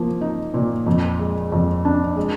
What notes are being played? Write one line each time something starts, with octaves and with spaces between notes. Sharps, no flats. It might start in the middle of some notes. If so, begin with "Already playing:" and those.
Already playing: F3 A#3
D#4
A#2
F2
G#3
F2
D4
G#3